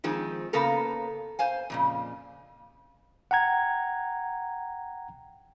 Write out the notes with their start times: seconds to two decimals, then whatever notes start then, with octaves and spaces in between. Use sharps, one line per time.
0.04 D#3 F3 G#3 C4
0.53 C#3 A#3 B3 A4 A#4
1.39 C5 F5 G#5
1.70 F2 A#2 C#3
3.31 F#5 G5 A#5 G#6